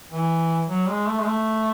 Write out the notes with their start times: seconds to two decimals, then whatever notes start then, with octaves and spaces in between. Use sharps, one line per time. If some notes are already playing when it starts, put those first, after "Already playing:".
0.11 E3
0.69 F#3
0.88 G#3
1.07 A3
1.20 G#3
1.26 A3